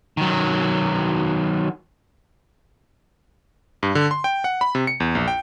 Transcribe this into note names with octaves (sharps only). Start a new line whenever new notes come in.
D#3 F#3
G2
D3
C6
G5
F#5
B5
C3
C#7
E2
A#1
G5